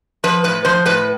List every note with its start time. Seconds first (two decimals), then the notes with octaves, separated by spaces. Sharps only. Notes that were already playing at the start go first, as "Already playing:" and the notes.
0.24 F3 B4
0.44 A2 B4
0.65 F3 C5
0.86 A2 B4